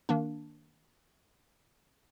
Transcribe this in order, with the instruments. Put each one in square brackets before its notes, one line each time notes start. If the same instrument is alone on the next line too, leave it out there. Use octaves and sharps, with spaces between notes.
[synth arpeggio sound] D#3 A#3 D4